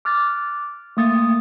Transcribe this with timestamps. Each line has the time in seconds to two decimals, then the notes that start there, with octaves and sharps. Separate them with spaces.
0.05 D6 F6 F#6 A6
0.97 A3 A#3 D#6 A6